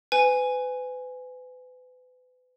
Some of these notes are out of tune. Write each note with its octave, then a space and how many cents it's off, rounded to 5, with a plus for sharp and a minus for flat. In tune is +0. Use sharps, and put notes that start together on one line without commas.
B4 +35 G#5 +0